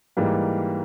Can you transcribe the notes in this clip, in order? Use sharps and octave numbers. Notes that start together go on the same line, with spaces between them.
G#2 E3 G3 A#3